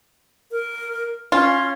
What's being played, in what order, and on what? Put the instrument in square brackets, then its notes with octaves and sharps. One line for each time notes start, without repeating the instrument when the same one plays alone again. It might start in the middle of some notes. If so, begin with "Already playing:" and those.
[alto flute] A#4
[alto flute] C#4 [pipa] F4